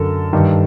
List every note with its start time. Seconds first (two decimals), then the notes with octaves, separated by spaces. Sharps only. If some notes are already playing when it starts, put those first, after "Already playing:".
Already playing: F#2 D3 A4 A#4
0.33 G2 D#3